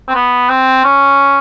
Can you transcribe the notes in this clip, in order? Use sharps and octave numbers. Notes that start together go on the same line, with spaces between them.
C4
B3
C4
C#4